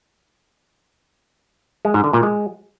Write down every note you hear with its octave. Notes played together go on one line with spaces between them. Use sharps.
G#3
G#2
D3
A#2
G#3